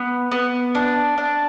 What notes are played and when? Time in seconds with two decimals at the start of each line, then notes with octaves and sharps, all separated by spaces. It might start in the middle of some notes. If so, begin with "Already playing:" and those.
Already playing: B3
0.32 B3
0.75 D4
1.18 D4